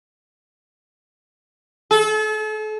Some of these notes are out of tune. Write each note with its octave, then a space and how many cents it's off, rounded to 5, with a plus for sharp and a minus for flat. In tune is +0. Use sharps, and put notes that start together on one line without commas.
A4 -40